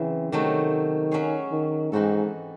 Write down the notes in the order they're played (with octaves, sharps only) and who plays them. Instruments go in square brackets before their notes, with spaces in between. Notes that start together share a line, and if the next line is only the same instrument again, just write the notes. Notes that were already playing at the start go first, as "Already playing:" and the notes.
Already playing: [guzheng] C#3 F#3 C4 [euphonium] E3
[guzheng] C3 F#3 A3 D#4 [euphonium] D#3
[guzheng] F#3 C#4 G#4 C#5
[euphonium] D#3
[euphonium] G#2 [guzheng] E3 C4 D#4 F#4 A4